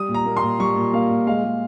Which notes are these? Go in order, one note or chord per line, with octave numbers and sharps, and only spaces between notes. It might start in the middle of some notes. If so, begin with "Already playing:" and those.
Already playing: G3 D#6
A#2
A#5
A#3
C6
A#2
G3 C#6
A#2
A#3 F5
A#2
G#3 F5
G#3